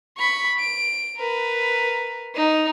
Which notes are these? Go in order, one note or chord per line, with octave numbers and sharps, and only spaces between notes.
B5 C#6
D7
A#4 B4
D#4